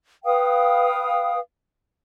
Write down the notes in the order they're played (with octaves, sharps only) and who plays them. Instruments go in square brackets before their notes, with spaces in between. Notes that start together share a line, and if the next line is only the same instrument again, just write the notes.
[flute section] B4 F5 G5 D#6